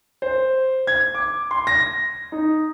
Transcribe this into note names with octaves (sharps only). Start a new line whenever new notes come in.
C5
G#6
D6
C6
A#6
D#4